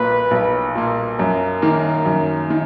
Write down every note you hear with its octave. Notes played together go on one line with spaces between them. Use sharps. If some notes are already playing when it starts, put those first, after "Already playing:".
Already playing: B1 A#2 A#3 B4
B1
A#2 A#3
F#2 A#4
D#3 A#3
F#2
D#3